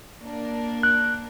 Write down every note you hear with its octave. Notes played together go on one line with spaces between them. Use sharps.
A#3 D4 A#4
F#6